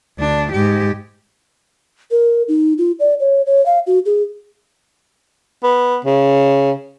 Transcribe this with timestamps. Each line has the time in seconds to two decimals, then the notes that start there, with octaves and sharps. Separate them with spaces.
0.18 D2 D4
0.52 G#2 G4
2.11 A#4
2.48 D#4
2.78 F4
3.00 D5
3.20 C#5
3.46 C#5
3.66 F5
3.87 F#4
4.06 G#4
5.63 B3
6.05 C#3